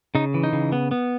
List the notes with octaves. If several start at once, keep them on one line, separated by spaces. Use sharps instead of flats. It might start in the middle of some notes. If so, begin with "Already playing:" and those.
C#3 D#4
E3
D#4
C#3
B3
B3